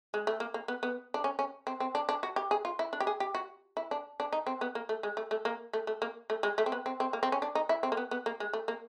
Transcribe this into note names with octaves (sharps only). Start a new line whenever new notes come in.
G#3
A3
A#3
A#3
B3
B3
D4
C#4
C#4
C4
C4
D4
D4
F#4
G4
G#4
F4
E4
D4
G4
G#4
G4
F#4
E4
D4
D4
D#4
C4
B3
A#3
A3
G#3
A3
A3
A#3
A3
A3
A#3
A3
G#3
A3
C4
B3
C4
C4
A#3
C4
C#4
D4
D#4
E4
C4
A#3
B3
B3
A#3
G#3
A3
A#3